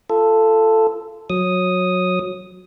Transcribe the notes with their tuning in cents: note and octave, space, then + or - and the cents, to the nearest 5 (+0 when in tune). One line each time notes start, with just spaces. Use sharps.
F4 -25 A4 +5
F#3 -20 D#6 +0